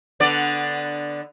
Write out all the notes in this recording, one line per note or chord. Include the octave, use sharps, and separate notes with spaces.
D3 B3 D5